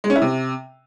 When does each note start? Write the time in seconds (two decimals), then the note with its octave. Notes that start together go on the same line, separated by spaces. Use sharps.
0.04 G#3
0.10 C#4
0.16 E4
0.22 C3